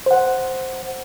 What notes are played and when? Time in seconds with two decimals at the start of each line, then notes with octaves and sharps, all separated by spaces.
0.06 C5 F#5